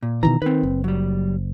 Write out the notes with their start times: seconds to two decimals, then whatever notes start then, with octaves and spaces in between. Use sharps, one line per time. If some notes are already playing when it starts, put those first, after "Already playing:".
0.03 A#2
0.23 B2 D#3 E3 A#5
0.42 D#3 C4 B4
0.63 F#1
0.84 F#3 G3